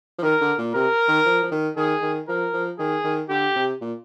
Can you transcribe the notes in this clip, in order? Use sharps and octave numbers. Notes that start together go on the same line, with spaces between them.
F3
D#3 A#4
D3
A#2
C3 A#4
D#3
F3
F3
D#3
D#3 G#4
D#3
F3 A#4
F3
D#3 G#4
D#3
D3 G4
C3
A#2